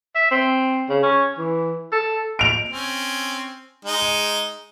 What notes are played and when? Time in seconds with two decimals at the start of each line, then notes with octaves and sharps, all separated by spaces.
0.15 E5
0.31 C4
0.89 C#3
1.03 C#4
1.38 E3
1.92 A4
2.39 D7 F7
2.69 C4 C#4
3.85 G#3 D#4